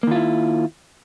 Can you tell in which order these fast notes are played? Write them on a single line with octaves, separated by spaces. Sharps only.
A#3 D#3 F4 E4